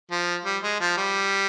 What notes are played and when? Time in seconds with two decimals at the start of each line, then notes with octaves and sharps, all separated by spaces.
0.11 F3
0.45 G3
0.63 G#3
0.80 F3
0.98 G3